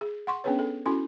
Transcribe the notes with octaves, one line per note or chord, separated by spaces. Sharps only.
G#4
F#5 C6 C#6
B3 C#4 D4 G#4 B4 C#5
A4
C#4 E4 F#4 A4 C6